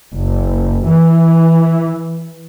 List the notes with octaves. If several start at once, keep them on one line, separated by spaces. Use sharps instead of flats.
F#1
E3